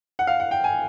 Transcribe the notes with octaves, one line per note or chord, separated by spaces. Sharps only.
F#5
F5
F#5
G5
G#5